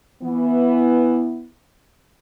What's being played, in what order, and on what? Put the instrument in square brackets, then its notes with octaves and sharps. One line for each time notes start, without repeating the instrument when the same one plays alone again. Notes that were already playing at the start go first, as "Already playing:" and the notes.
[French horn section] E3 B3